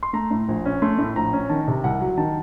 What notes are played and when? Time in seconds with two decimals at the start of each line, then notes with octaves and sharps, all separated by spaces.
0.03 C6
0.13 A3 A#5
0.31 A2
0.48 A#1
0.65 C#4
0.82 A3 C6
0.98 A2
1.16 A#1 A#5
1.33 C#4
1.49 D#3 A5
1.68 C3
1.84 C2 F#5
2.00 F#3
2.17 D#3 A5